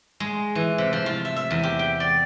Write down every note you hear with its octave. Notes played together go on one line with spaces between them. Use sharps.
G#3
E3
C3
F3
F4
E5
E5
E2
G4
G5
D5